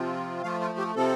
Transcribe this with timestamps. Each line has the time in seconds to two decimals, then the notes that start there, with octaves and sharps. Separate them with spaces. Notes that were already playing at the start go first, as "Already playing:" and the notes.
Already playing: C3 F3 C4 F4
0.43 F3 A3 F4 F5
0.61 F4
0.78 G4
0.96 C3 F3 C4 A4